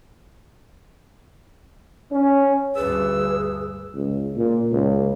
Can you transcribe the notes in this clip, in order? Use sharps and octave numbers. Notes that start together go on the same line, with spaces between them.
C#4
D2 G2 G#4 B4 E6
C#2
A#2
C#2